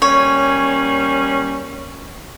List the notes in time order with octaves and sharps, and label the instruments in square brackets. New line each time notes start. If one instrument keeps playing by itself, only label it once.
[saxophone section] G3 A#3 C#4 [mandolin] C#5